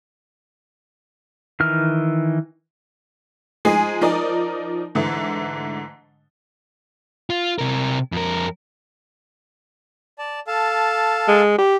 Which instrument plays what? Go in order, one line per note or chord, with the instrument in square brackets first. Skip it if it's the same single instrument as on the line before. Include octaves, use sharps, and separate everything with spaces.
[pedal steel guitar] D#3 E3 F6
[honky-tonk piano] F3 G#3 D#4 G#4 G#5
F3 D#4 A#4 D5 D#5
G#2 D3 E3 A3
[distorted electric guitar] F4
C3 A#4
F2 A#4
[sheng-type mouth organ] D5 A5
A4 F5 A5
[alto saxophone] G#3
G4